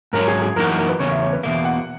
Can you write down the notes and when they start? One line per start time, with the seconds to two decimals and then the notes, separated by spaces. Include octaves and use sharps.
0.13 G#2 F#3 C#4 A#4
0.28 G#4
0.42 G#4
0.56 F#2 E3 A#3 D#4 F#4 A#4
0.78 A#4
0.89 B4
1.00 E2 C#3 C#4 C#5
1.11 E5
1.21 C#5
1.33 B4
1.43 E2 B2 A#3 E5
1.65 F#5